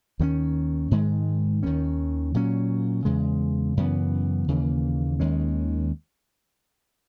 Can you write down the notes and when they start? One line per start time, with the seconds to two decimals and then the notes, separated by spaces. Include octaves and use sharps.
0.19 D#2 D#3 G#3 C#4
0.91 G#2 D#3 G#3
1.63 D#2 D#3 A#3 C#4
2.34 A#2 F#3 C#4
3.05 E2 C#3 G#3
3.77 F#2 C#3 E3 B3
4.48 D#2 C#3 E3 A#3
5.20 D#2 D#3 G#3 C#4